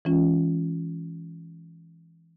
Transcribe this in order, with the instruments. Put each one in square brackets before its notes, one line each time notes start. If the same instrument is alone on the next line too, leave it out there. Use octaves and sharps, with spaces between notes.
[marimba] E3 G#3 C#4 F4